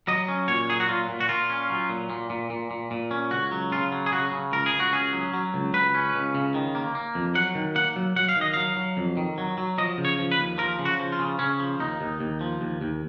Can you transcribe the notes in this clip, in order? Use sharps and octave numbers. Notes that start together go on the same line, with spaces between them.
F#3 D#5
C#4
A#2 C#5
F#3 G#4
F#4
A#2 F4
A#2
F#4
A#2 F4
C#4
F#3
A#2
A#2
A#2
A#2
A#2
A#2
C#4
C#2 F#4
F#3
C#3 F4
F#3
G#4
C#3 F#4
C#3
C#2 A#4
G#4
C#2
F#4
C#4 G#4
F#3
F#3
C#2
C#2 B4
C#4
C#2
C#3
D#3
A#3
A#3
F2
F#3 F#5
D#3
A#3 F#5
F#3
F#3 F#5
F5
D#3
D#5
F#3 F5
F#3
F2
D#3
F#3
F#3
F3 D#5
C#3
C#5
F3
B4
D#2
F3 A#4
C#3
F#4
F3
F4
C#3
C#3 C#4
F3
D#2 D#4
D#2
D#2
F3
D#2
D#2